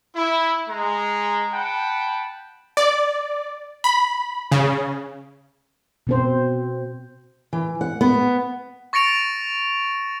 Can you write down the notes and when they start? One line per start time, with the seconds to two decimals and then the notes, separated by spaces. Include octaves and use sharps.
0.16 E4
0.69 G#3 A#5
1.54 F#5 G5 A5 B5
2.77 D5
3.84 B5
4.52 C#3
6.07 B2 C4 C5
7.53 E3
7.81 F#5
8.01 B3
8.93 C#6 A6 A#6 C#7 D7 F7